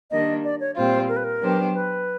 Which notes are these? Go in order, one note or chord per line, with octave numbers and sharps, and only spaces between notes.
D#3 G3 A#3 D4 D#5
D5
C#5
A#2 G3 C4 F4 C5
A#4
B4
A#4
F#3 B3 D4 G4 C5
B4